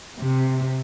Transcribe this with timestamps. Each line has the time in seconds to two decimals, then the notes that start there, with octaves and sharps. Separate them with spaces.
0.19 C3